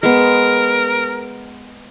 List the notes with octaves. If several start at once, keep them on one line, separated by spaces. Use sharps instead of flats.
G#3 B3 A#4